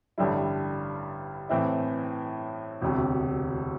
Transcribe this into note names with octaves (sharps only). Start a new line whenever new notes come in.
A1 G2 D3 G3 E4
A2 E3 C4 E4
E1 D2 C3